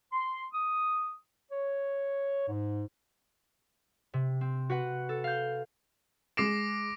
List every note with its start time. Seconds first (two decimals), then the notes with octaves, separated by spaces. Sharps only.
0.13 C6
0.53 D#6
1.51 C#5
2.48 G#2
4.14 C3
4.41 C4
4.70 F#4 B4 F#5
5.09 A4
5.24 F5 G6
6.37 G#3 D6 A#6 C7 D7 E7